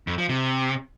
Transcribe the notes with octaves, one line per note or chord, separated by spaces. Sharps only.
F2
F3
C3